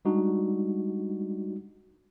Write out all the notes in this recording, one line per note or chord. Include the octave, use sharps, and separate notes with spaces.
G3 G#3 D4 D#4 F#4